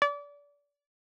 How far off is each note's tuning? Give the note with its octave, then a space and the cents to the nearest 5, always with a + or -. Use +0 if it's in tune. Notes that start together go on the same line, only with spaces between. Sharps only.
D5 -30